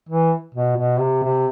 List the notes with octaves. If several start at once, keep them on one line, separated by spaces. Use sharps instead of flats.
E3
B2
B2
C3
C3